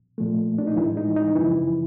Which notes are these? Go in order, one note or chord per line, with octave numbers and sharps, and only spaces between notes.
A#2 F3 A3
D4
D#4
A2 E3 G#3 E4
D#4
D#4
F#2 C#3 E3 F3 E4